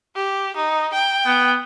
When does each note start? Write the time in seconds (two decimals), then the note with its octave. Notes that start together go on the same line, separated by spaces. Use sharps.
0.16 G4
0.56 D#4
0.94 G5
1.26 B3